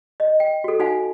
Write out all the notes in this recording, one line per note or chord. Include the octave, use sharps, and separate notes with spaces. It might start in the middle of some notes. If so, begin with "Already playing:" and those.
D#5
G5
F#4 A4
D#4 F#4 F5 F#5 G#5